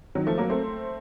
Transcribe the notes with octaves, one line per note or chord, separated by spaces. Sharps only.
D#3 F#3
F3 A3
F#3 A#3
A3 C4